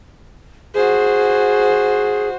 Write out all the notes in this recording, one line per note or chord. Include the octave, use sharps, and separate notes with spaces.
F#4 G#4 C5